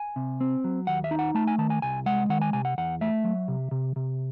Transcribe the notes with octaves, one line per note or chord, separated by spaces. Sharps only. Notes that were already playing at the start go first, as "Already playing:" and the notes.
Already playing: G#5
C3
C4
F#3
D#2 F#5
E5
D#4
F#5
A3 A5
G#5
D#3 A5
G#5
C2 G#5
G#3 F#5
D#3 F#5
G#5
C3 G#5
F#5
E2 F#5
A3 E5
F#3
C3
C3
C3